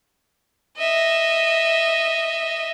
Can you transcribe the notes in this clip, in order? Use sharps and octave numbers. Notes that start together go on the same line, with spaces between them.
D#5 E5